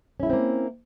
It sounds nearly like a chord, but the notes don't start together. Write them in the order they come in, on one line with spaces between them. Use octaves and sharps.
C#4 E4 A3 C4 A#3